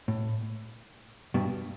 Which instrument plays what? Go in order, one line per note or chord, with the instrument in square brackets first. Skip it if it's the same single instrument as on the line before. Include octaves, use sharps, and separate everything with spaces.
[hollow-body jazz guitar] A2
G2 B2